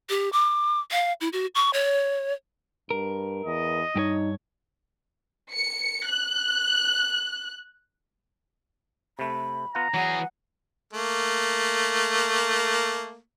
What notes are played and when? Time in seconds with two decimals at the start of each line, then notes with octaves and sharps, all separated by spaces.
0.09 G4
0.33 D6
0.91 F5
1.21 E4
1.33 F#4
1.55 C#6
1.73 C#5
2.91 G2 A#4
3.45 E2 D#5
3.96 G2 D#4 G4 C#5
5.53 C#7
6.08 F#6
9.19 C3 A3 B5
9.75 B3 F4 F#5 A#5
9.94 E3 F#3 G#4 F#5
10.93 A3 A#3